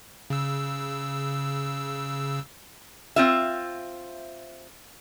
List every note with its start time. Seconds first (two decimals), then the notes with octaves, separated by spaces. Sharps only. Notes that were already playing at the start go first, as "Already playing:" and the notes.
0.30 C#3 E6
3.16 C4 F4 E5